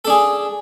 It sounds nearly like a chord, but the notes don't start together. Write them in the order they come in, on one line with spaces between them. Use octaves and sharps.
A4 D4 G#4